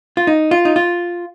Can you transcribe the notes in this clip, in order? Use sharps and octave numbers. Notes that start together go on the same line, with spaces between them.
F4
D#4
F4
D#4
F4